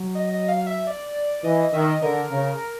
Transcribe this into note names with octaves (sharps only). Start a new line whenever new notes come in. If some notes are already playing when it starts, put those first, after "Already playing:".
Already playing: F#3
D#5
D#5
F5
E5
D5
E3 D#5
D#5
D#3 E5
D#5
D3 A#4
C#3